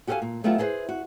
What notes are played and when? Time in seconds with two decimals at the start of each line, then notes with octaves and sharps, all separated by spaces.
0.07 F#4 G4 A4 A#4 F5 G#5
0.22 A#2
0.44 F#3 A3 B3 E4 F4 G4
0.58 E4 G#4 A4 B4 C5
0.89 F#4